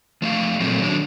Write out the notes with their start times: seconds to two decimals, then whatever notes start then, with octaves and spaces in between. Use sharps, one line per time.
0.22 F3 A3 F5
0.60 A#2 F#3 A3 A#3 C4
0.81 D#3 F#3 D4